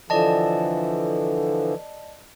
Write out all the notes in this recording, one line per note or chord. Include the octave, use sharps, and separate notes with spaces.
D3 E3 F3 D5 D#5 A5